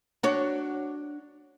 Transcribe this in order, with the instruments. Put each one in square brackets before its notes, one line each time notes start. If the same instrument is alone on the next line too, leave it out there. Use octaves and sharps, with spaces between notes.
[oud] D4 F#4 C#5